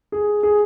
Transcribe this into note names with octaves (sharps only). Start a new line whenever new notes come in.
G#4
G#4